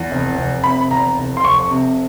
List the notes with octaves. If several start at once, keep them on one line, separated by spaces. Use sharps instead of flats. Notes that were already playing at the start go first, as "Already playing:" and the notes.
Already playing: E2
F1
F1
C3 B5
E2 A#5
F1
C6
F1 C#6
C3